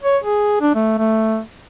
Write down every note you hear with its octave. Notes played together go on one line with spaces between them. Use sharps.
C#5
G#4
D4
A3
A3